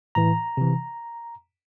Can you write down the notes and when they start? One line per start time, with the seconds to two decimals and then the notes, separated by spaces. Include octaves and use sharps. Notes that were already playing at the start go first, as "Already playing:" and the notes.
0.15 A2 E3 A#5
0.57 C3 E3